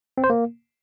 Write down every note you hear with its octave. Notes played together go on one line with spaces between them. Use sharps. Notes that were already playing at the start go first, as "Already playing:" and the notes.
C4
C5
A#3